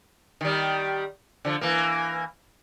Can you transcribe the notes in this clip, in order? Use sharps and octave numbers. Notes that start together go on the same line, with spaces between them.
D#3 G3
D3 F3
E3 A#3